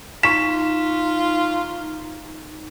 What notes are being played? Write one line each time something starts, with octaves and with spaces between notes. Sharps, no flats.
D#4 F4 C#6 B6 E7